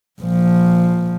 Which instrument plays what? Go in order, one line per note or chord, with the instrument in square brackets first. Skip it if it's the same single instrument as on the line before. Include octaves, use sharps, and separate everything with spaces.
[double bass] A#1 F3